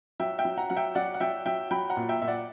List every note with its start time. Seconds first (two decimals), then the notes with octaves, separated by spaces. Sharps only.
0.20 F#3 E5 G5
0.38 E5 G5
0.45 F#3
0.58 F#5 A#5
0.70 F#3 F#5
0.76 E5 G5
0.95 F#3 D5 F#5
1.14 F#5
1.20 F#3 E5 G5
1.46 F#3 E5 G5
1.71 F#3 G5 B5
1.90 F#5 A#5
1.97 A#2
2.09 E5 G5
2.21 A#2 E5
2.28 D5 F#5